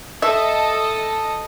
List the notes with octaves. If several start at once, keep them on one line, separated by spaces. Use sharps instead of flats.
A4 D#5 E5